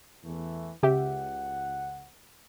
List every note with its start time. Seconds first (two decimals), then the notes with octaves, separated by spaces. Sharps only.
0.23 E2 E3 A3
0.83 C#2 C#3 G4 E5 F#5